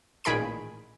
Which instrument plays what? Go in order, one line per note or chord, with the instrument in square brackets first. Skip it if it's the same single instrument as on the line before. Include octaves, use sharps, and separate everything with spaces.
[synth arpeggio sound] A1 A#2 D#3 G#4 B5 D7